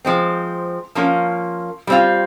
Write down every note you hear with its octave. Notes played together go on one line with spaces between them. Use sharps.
F3 G#3 C4
F3 A#3 C#4 F4 A#4
G3 C4 F4